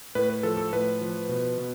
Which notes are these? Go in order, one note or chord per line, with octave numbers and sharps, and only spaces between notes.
A2 B4
B4
F3 A4
A4
A2 B4
F3
B2
B2